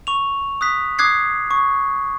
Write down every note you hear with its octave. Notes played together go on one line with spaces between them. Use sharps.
C#6 F7
D#6 F#6 B6
D6 D#6 F#6 G#6 C7
C#6